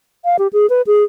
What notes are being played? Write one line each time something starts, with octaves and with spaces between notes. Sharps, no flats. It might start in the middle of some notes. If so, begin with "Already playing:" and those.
F5
G4
G#4
B4
G#4